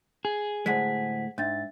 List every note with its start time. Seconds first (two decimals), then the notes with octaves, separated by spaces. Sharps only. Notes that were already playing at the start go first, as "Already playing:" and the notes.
0.25 G#4
0.66 D2 A2 G#3 C5 F#5 B6
1.38 G#2 D4 E5 A6